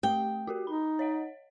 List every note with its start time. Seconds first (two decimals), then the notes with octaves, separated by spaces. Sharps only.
0.03 A3 G4 G5
0.47 F#4 G4 A#4
0.67 D#4 B5
0.99 C#5 D#5 F#5